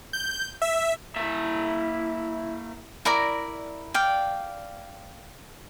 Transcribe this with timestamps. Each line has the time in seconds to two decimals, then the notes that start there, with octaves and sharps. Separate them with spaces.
0.13 G6
0.62 E5
1.16 A#3 E4 E5
3.05 E4 A#4 D5 A#5
3.94 D5 F5 G5